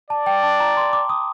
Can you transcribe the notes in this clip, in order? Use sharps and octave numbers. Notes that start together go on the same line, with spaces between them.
D5 A5
G5
A5
A#5
C6
D6
D#6